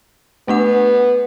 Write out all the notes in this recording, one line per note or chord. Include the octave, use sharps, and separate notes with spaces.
A3 B3 D4 F#5